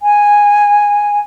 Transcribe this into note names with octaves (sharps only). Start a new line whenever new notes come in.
G#5